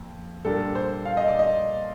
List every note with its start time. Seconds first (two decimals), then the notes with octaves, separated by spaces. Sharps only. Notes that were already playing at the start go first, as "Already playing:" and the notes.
Already playing: F2 A#3
0.45 A#2 G3 D4 G4 A4 A#4
0.75 C5
1.05 F5
1.17 D#5
1.28 D5
1.39 D#5